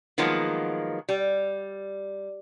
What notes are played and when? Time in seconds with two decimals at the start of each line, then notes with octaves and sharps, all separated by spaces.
0.18 D#3 F3 F#3 G#3 A#3 B3
1.09 G3